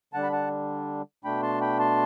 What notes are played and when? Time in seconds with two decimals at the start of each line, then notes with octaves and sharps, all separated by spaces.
0.13 D3 G3 D4 F#5 A5
0.23 B5
0.32 F#5 A5
1.24 B2 A3 D4 G5 B5
1.43 A5 C6
1.61 G5 B5
1.79 A5 C6